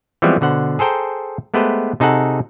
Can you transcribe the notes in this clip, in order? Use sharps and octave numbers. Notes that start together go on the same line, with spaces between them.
E3 F3 G3 G#3 B3 C4
B2 D3 C5 F#5
G#4 A4 C5 G5 A#5
G#3 A3 B3 G4 B4 C5
C3 D#4 G#4 A4 F#5